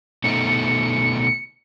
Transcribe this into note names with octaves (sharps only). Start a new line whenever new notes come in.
B2 A3 D#4 C#7